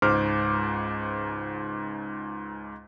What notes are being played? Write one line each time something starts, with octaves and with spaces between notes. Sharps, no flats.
C#2 G#2 C5 D6 F6